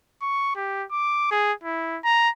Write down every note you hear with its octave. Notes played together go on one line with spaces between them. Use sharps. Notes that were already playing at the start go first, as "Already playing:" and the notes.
C#6
G4
D6
G#4
E4
A#5